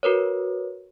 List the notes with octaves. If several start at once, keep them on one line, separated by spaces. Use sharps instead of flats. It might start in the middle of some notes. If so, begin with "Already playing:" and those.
F#4 A#4 B4 C#5